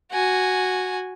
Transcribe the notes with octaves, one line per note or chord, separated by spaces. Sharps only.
F#4 G#5